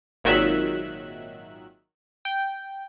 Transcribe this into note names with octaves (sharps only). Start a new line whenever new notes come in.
G#1 A#2 D#3 F#3 E5 F#6
G5